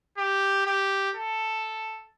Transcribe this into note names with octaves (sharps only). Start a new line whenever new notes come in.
G4
G4
A4